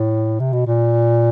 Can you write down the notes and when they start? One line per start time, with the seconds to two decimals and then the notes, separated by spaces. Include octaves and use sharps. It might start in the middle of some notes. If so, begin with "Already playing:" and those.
Already playing: A2
0.40 C3
0.53 B2
0.67 A#2